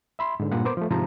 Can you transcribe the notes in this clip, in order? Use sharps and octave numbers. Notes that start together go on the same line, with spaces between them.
E5 B5 C6
G#2 D3
G2 A#2 G#3 A#3 F#5
B3 A#4 C5 D6
F3 A3
G#2 C3 D#3 F3 A5 A#5